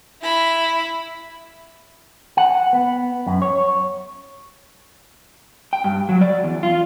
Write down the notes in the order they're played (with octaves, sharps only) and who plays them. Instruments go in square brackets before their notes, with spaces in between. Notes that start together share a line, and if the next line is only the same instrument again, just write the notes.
[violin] E4 B5
[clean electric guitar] F#5
B3
F#2
C#5
[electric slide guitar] G5
G2
F#3
D5
E2
F4